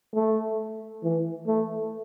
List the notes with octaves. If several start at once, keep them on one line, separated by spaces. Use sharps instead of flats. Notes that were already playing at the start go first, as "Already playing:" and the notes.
A3
E3
A3